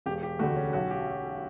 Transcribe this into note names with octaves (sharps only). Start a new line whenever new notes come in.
E1 G4
G4
D2 D3 A3 F#4
C#4
B1 F#4
G4